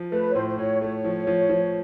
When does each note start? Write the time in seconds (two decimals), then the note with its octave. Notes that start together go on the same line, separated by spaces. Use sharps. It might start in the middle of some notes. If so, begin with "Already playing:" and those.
Already playing: F3
0.12 A3 B4
0.30 C#5
0.35 A2 C5
0.49 C5
0.58 A2 C#5
0.81 A3 C#5
1.04 F3
1.27 F3
1.50 F3